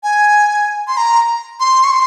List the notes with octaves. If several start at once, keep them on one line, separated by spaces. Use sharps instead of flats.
G#5
C6
A#5
C6
C#6
C6